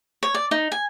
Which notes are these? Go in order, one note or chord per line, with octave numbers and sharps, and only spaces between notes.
C#5
D5
D#4
G#5